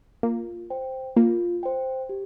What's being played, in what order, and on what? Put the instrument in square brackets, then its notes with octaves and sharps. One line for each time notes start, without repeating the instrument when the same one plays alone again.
[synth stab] A#3 [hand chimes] F4
[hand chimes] C5 G5
[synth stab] A#3 [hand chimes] F4
[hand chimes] C5 G5
G4